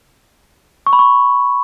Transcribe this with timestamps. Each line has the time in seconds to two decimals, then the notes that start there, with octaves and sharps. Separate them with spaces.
0.87 C#6
0.93 B5
0.99 C#6